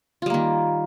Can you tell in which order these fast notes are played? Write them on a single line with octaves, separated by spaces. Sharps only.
F4 G3 A#3 D#3